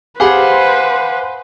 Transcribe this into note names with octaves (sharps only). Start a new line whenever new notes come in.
G4 G#4 B4 C5 F5 F#5 B5